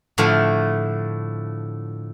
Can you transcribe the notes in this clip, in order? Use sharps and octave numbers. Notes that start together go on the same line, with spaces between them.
A2 D3 F3 A3